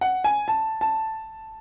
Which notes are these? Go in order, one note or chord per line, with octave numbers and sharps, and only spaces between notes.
F#5
G#5
A5
A5